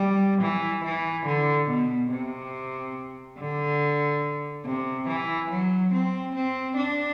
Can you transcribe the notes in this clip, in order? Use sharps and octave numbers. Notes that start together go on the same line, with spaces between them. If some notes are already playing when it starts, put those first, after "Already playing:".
Already playing: G3
E3
E3
D3
B2
C3
D3
C3
E3
F#3
C4
C4
D4